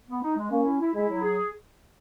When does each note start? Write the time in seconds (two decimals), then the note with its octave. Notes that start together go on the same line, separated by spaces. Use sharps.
0.08 B3
0.23 D#4
0.36 G#3
0.50 A#3 C#4
0.65 E4
0.80 E4
0.93 G#3 E4
1.09 F#3
1.22 G#4